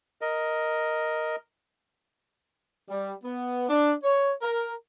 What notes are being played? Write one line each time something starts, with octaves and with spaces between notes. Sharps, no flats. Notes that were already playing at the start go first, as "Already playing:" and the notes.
A#4 D#5
G3
B3
D4
C#5
A#4